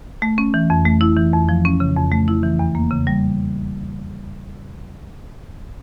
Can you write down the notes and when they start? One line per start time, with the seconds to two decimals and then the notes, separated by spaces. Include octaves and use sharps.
0.22 A3
0.38 C#4
0.54 E3
0.70 F2
0.86 A3
1.01 E4
1.17 E3
1.33 F2
1.49 F3
1.65 C#4
1.80 C#3
1.96 F2
2.12 A3
2.28 E4
2.43 E3
2.59 E2
2.75 A#3
2.91 C#3
3.07 G3